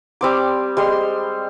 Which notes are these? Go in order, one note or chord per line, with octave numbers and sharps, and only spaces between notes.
G3 C4 D6
G3 G#3 C6